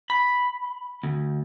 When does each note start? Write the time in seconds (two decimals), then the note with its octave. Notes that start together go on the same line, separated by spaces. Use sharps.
0.10 B5
1.03 D2